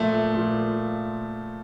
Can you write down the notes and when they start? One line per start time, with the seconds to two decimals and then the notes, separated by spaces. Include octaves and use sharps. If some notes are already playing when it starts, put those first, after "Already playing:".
Already playing: A#2 F3 A3
0.34 A#2 F3